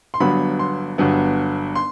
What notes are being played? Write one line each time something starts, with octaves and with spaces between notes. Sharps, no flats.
C6
G1 G2 F#3 B3 B5
C6
G1 G2 F#3 B3
C6